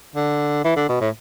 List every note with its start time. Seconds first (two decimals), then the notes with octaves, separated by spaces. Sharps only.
0.15 D3
0.64 E3
0.76 D3
0.89 B2
1.01 A2